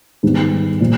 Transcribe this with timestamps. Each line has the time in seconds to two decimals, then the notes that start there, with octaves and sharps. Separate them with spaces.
0.23 G#2 D#3 G3 B3
0.80 A#2 F3